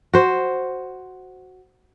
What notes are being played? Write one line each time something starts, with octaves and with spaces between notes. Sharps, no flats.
F#4 C5